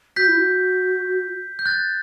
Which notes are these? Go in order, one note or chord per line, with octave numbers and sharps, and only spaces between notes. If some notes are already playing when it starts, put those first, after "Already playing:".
F#4 G6 B6
E4
F#4
G6
F#6 A6